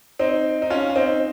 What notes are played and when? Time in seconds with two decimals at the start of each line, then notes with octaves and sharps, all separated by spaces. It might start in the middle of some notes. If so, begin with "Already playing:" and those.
0.19 C4 D#4
0.62 D#4
0.70 C#4 F4
0.90 C#4
0.96 C4 D#4